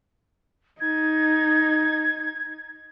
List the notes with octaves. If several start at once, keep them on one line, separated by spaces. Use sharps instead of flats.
D#4 G#6